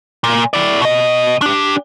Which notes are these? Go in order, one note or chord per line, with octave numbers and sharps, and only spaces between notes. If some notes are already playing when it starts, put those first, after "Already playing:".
A#2
E4 D5
B2 D#5
D4 G4